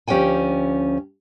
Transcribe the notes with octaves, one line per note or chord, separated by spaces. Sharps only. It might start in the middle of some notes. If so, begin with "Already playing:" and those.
D2 F3 C#4 G4 G5 G#5